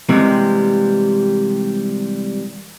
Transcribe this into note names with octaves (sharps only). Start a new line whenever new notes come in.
C3 E3 G3 G#3 A#3